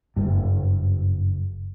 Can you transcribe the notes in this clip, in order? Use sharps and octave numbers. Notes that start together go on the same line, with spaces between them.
F#1 G2